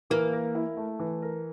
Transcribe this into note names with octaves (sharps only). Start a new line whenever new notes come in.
E3 A#3
A#4
E4
A3
E3
A#4